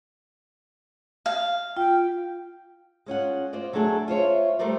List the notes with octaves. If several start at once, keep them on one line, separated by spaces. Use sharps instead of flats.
F5
F4 G5
G#3 C#4 F4 F#5
F4 C5 D5 D#5
F#3 A3 D4 G#4 A4
F4 C5 C#5 E5
G3 A3 A#4 C5 D5